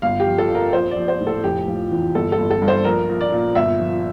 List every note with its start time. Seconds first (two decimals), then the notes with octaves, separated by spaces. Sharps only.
0.02 G1 F5
0.20 G4
0.27 F3
0.38 A4
0.50 F2
0.55 A#4
0.73 A#1 C5
0.91 D5
0.96 A#1
1.08 C5
1.21 A2
1.27 A4
1.44 F1 G4
1.68 F3
1.91 E2
2.15 G1 A4
2.32 A4
2.38 G1
2.51 A4
2.62 G2
2.68 C5
2.85 A#1 A#4
3.09 A#1
3.21 D5
3.32 A#2
3.55 G1 E5
3.79 F3